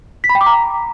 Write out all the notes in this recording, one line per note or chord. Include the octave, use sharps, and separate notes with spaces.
B6
B5
G5
D6
A#5